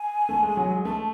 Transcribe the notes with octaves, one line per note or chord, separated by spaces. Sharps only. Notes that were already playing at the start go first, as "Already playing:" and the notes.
Already playing: G#5
A3
G#3
F#3
G#3
A3 A5